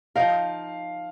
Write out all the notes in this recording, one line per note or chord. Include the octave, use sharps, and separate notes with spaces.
F3 D#4 A#4 F5